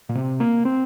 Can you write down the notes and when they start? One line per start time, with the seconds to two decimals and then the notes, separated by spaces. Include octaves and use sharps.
0.09 A#2
0.15 C3
0.40 A#3
0.65 C4